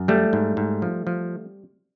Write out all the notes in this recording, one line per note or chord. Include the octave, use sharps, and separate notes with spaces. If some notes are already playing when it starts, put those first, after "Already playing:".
Already playing: F#2
F3 G3 A3
G#2
G#2
F3
F3